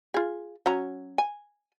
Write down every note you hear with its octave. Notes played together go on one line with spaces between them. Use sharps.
F4 G#4
F#3 C#4 A#5
G#5